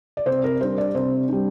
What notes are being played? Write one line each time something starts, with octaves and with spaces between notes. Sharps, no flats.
D5
C3 C5
A#4
G3 D4 C5
D5
C3 C5
G3 D4